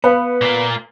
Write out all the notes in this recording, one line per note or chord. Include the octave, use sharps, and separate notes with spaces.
B3 B4 F5
A#2 A#3